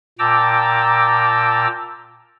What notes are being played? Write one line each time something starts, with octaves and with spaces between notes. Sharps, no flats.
A#2 G5 A5 A#5 D6 E6